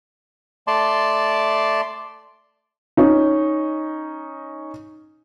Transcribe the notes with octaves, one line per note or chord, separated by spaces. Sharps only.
A3 D5 A5 C6
C#4 D#4